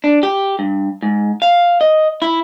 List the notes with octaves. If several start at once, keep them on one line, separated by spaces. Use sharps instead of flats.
D4
G4
G2
G#2
F5
D#5
E4